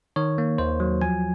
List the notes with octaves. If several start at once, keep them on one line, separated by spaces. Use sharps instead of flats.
D#3 C#5
A#3
D#2 C5
F#3
F3 G#5